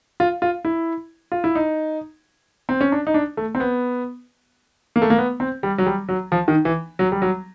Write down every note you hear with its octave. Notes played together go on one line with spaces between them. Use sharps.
F4
F4
E4
F4
E4
D#4
C4
C#4
D4
D#4
D4
A3
C4
B3
A#3
A3
A#3
B3
C4
G3
F#3
G3
F#3
F3
D#3
E3
F#3
G3
F#3